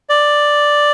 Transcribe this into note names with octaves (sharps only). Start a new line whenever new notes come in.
D5